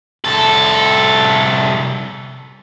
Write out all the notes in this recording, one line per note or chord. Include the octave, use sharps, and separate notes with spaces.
C2 A4